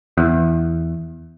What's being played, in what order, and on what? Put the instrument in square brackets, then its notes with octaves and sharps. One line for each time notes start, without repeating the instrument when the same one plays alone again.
[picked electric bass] E2